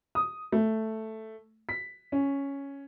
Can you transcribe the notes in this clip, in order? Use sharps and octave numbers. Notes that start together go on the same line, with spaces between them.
D#6
A3
B6
C#4